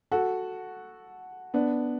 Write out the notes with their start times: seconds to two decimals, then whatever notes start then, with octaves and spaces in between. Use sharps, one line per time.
0.11 F#4 A4
1.54 B3 D4